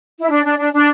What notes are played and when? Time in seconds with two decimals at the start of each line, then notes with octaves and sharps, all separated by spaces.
0.20 E4
0.29 D4
0.44 D4
0.58 D4
0.73 D4